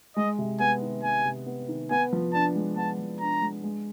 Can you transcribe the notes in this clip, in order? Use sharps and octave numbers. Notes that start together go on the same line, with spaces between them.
G#3 D#5
C3
B3 G#5
D#3
G#3 G#5
C3
B3
D#3
B3 G#5
F3
D4 A5
G#3
B3 A5
F3
D4 A#5
G#3
G#3